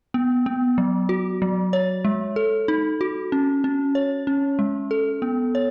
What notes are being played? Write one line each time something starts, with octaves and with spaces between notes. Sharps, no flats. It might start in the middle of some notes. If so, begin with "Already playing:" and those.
B3
B3
F#3
F#4
F#3
C#5
G#3
A4
D#4
F#4
C#4
C#4
C#5
C#4
G#3
A4
B3
C#5